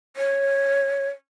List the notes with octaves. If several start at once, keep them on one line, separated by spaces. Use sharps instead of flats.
C#5